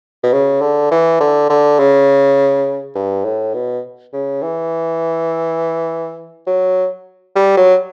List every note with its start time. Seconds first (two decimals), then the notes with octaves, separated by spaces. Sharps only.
0.23 B2
0.33 C#3
0.61 D3
0.91 E3
1.20 D3
1.50 D3
1.79 C#3
2.95 G2
3.25 A2
3.54 B2
4.13 C#3
4.42 E3
6.47 F#3
7.36 G3
7.57 F#3